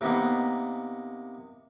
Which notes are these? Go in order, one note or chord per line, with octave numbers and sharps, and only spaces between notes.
C3 A#3 B3 D#4